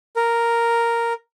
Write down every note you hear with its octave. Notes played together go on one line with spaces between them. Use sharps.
A#4